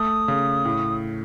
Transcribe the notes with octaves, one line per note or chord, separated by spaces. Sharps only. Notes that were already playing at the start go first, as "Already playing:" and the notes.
Already playing: A3 D#6
C#3
A2